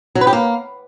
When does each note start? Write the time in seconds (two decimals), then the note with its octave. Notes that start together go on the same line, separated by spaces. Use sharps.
0.15 F#3
0.21 B4
0.27 G4
0.33 A#3